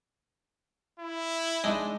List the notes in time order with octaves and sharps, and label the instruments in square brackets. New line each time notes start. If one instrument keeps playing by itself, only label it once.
[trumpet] E4
[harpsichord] G#3 D4 D#4